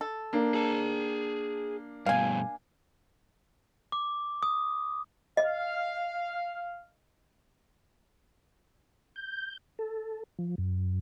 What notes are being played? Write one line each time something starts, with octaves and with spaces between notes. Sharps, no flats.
A4
A#3 D4
G#4 A5
G2 B2 F5 G#5
D6
D#6
D#5 F5
G6
A4
F3
F#2